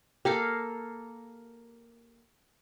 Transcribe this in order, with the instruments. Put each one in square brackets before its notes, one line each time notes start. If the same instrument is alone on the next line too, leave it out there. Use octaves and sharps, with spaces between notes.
[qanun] A#3 A4 F5 [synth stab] G4